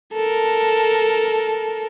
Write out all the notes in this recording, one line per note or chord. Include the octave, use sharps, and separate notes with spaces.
A4 A#4